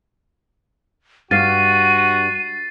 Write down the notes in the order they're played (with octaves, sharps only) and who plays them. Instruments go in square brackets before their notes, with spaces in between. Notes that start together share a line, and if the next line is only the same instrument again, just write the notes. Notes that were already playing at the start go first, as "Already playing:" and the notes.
[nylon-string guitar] G2 F5 [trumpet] F#4 [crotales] A6 C7 [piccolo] D#7